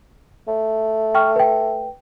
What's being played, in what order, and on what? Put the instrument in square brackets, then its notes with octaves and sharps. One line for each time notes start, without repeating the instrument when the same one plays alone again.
[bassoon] A3
[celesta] G5 C#6 F6
B4 G5